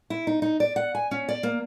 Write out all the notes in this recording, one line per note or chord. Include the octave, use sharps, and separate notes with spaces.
E4
D#4
D#4
D5
F#5
G#5
C#4
D5
A#3